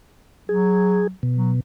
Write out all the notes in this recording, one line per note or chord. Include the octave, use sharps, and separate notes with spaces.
F#3 G#4
B2
F#3